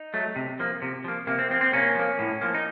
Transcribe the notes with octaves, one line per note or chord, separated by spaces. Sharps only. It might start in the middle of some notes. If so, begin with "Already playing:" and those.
Already playing: D#4
F#3 A3
C3
F3 A#3
C3
F3 A#3
C3 A#3
C4
F3 A#3 C4
C4
C3 A#3 C#4
F3 A#3
A2
F3 A#3
D#4